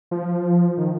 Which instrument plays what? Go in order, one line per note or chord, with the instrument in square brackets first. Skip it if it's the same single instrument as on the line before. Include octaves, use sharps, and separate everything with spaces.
[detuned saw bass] F3
D#3